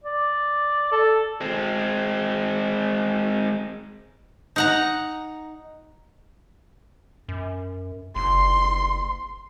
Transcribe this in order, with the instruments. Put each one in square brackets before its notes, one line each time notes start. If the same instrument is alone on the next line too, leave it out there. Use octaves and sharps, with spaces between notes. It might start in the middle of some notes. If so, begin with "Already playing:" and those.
[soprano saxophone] D5
A4
[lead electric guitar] G#3 C4
[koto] D#4 F#5 A#5
[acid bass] F#2
[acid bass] F#1 [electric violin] C6